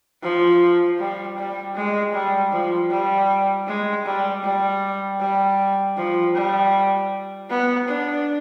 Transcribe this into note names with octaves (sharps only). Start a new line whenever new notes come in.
F3
G3
G3
G#3
G3
F3
G3
G#3
G3
G3
G3
F3
G3
B3
D4